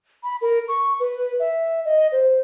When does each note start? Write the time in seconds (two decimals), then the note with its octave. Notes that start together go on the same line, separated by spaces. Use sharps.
0.23 B5
0.41 A#4
0.68 C#6
1.00 B4
1.40 E5
1.85 D#5
2.12 C5